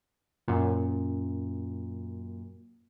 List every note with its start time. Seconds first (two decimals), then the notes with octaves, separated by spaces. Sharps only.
0.48 F#2 A#2